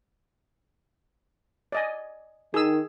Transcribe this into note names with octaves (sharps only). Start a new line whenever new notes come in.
D5 D#5 G#5
D#3 G#4 E6